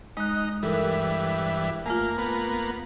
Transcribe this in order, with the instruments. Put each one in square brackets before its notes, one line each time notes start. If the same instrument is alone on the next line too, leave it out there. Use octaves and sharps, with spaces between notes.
[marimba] G#3 F#6 [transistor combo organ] D#4
[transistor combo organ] G2 E3 [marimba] A4 A#4
[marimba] F2 A3 F4 [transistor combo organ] A#3
[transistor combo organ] A#3 B3